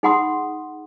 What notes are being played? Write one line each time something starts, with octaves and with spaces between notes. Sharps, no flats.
D#4 G#4 F#5 B5 C6 D#6